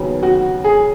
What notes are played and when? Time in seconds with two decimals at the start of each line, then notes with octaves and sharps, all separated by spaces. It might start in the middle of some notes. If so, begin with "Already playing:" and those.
Already playing: D#2 C#3 F#3 B3
0.23 F#4
0.64 G#4